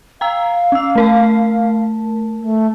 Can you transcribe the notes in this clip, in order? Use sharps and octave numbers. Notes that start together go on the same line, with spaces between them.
F5 G5 A#5 E6
C#4 E6
A3 A#4 A5
A3